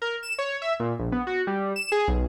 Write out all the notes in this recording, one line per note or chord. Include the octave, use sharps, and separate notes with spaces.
A#4
E7
C#5
E5
A#2
A#1
B3
F#4
G3
E7
G#4
B1